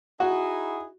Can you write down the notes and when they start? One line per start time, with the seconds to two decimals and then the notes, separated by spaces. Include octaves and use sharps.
0.20 D#4 E4 F#4 G#4